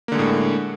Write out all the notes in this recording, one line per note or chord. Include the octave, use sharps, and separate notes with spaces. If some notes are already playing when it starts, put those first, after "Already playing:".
A2 D3 G#3 A#3